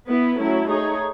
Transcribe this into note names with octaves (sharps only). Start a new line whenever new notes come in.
B3 E4 B4
F#3 A3 C#4 E4
A3 D#4 G#4 C#5